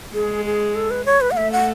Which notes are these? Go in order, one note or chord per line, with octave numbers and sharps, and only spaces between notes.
G#3 G#4
G#4
A4
B4
C#5
B4
F#5
A3 E5
F#5